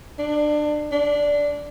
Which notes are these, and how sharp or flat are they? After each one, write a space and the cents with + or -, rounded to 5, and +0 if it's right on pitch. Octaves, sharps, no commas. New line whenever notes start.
D4 +25
D4 -10